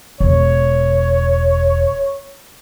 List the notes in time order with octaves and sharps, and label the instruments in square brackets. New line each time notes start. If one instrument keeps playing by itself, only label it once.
[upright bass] E1 [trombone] C#5